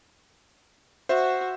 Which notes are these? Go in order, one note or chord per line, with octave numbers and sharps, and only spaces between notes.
F#4 C5 E5